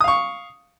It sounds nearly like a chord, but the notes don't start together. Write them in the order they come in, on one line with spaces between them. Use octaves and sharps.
D#6 F5 C#6